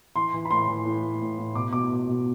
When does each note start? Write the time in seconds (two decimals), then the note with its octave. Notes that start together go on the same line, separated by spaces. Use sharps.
0.15 E3 C6
0.34 E3
0.45 B5
0.51 A2 C6
0.68 E3
0.85 A2
1.04 A2
1.20 A2
1.38 A2
1.55 B2 D6
1.72 B2 D6
1.90 B2
2.08 B2